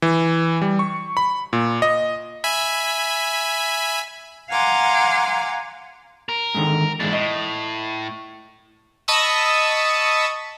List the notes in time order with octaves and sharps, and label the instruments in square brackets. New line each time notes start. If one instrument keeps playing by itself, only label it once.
[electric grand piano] E3
G3
C#6
B5
A#2
D#5
[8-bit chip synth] E5 G#5 B5
[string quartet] F5 F#5 G#5 A#5 C6 D6
[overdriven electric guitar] A#4
[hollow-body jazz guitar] G#2 D3 D#3
[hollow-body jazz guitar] E2 G#2 [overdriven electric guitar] D4 E4
[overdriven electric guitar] A2 [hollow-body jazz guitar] D#5
[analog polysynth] D#5 A5 B5 C#6 D#6 E6